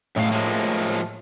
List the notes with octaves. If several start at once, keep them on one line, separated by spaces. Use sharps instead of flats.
F#2 A2 G#3 F5
F3 G#3 A#3